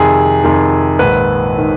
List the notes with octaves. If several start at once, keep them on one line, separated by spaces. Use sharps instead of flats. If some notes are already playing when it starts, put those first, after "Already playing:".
Already playing: F2 C3 D#3 G#4
F2 C3 D#3
A#1 G#2 D#3 B4
D#3